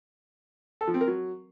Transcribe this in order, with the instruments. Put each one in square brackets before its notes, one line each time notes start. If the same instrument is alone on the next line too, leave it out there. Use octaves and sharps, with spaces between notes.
[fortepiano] A4
F3
C4
A#4
F#3